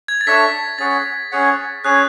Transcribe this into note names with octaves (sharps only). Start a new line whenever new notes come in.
G#6
A6
D4 A4 C#5 E5 B6
C#4 G#4 C#5 F#5 A6
C#4 G#4 C#5 F#5
C#4 G#4 C#5 F#6